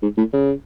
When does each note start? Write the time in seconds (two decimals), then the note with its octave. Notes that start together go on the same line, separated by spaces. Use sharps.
0.02 G#2
0.18 A2
0.33 C#3